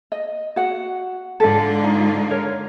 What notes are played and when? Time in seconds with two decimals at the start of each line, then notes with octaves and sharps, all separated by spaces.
0.12 D#5
0.56 F#4 F#5
1.40 G#2 D3 F4 A4 D5
1.84 D#4
2.31 A#4 C#5